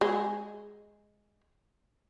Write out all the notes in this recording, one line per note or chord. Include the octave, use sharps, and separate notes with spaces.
G#3